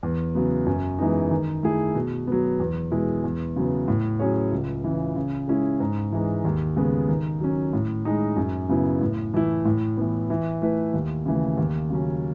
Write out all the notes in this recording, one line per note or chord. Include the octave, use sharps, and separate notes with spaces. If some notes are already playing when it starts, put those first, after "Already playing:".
E2
C#3 F#3 B3
F#2
E3 G#3 B3 D#4
D#3
A3 E4 G#4
B2
F#3 B3
E2
B2 G#3 B3 E4
E2
C#3 F#3 B3
A2
F#3 C#4 G#4 C#5
C#2
C#3 E3
C#3
G#3 C#4 E4 G#4
G#2
E3 G#3 D#4
D#2
C#3 G#3 B3
D#3
F#3 C#4
A2
G#3 D#4
F#2
C#3 F#3 B3 E4
A2
E3 A3 E4
A2
E3 B3
E3
A3 E4 B4
D#2
C#3 E3 A3
D#2
C#3 F#3 C#4